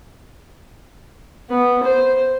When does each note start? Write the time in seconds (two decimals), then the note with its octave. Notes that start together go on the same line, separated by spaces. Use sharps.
1.50 B3
1.83 C5